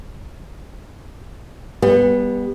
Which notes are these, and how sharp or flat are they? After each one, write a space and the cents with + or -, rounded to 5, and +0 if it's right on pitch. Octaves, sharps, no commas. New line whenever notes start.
G3 +25 B3 -10